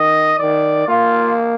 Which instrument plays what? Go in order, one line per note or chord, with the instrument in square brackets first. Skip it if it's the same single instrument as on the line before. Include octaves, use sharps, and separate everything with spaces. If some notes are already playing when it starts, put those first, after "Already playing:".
Already playing: [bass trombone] D#3 [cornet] D#5
[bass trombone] D#3 [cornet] D5
[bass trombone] A#3 [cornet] F4